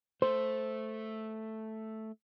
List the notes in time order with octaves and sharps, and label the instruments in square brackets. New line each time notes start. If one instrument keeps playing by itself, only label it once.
[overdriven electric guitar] A3 [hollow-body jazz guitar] C5